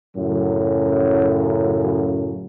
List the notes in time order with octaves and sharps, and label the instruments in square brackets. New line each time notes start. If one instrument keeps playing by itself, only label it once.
[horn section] F#2 A2 C#3 F#3